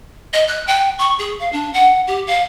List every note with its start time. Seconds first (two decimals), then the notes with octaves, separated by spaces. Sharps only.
0.33 D#5
0.48 F#6
0.67 G5
0.99 C#6
1.19 G#4
1.39 F5
1.53 D4
1.73 F#5
2.07 G4
2.27 F5